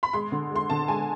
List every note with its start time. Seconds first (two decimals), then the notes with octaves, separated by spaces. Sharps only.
0.03 B5
0.13 G#3 C6
0.32 D3
0.51 G#3
0.56 C6
0.70 D3 A5
0.88 G#3 G#5